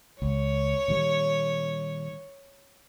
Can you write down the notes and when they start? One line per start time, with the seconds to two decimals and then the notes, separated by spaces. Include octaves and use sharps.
0.22 C#2 C#5
0.88 A#2 D#3 G3